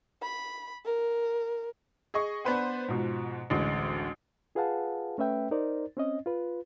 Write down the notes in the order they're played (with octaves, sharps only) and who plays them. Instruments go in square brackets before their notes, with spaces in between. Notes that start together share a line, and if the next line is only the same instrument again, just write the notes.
[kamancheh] B5
A#4
[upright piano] G#4 D#5 C#6
B3 D4 B4 C5 F#5
G#2 B2 F3
A1 D2 G#3
[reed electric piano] F4 G#4 B4 F5 F#5 A5
A3 C#4 B4 E5 G5
D#4 A#4 C5 D5
C4 C#4 D#5
F4 B4